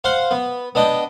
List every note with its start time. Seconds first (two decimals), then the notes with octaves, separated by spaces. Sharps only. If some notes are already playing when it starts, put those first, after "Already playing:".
0.04 C5 F5 F#5 C6
0.31 B3
0.75 B3 D4 D#5 G5